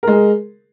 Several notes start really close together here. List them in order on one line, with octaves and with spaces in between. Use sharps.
A#4 G#3 G#4